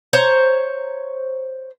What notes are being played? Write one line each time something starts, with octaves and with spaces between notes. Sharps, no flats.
C5 C#5 A#5